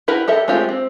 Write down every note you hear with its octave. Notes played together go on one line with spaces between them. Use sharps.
E4 G4 A#4 B4 F#5
G4 A4 A#4 E5
G#3 A3 C4 F4 G4
C4